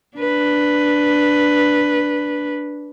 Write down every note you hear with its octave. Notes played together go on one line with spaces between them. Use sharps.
D4 B4